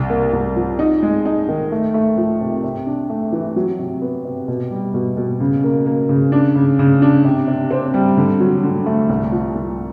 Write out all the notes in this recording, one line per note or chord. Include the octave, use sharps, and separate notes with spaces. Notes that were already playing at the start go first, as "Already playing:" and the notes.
Already playing: C2
A#3
C2
F3
D#4
G#3
D#4
D#3
A3
A3
F3
C3
C3
D4
A3
E3
F#3
C3
B3
C3
B2
G3
B2
B2
C#3
A#3
A#3
C#3
D4
C#3
C#3
D4
C3
C3
C4
G3
D3
F#3
D3
A3
C2
F3
C2